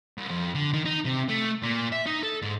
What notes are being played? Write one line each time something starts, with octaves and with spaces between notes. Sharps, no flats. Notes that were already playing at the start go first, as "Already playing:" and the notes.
C2
F2
D3
D#3
D#4
C3
A3
A#2
E5
D#4
A4
G#2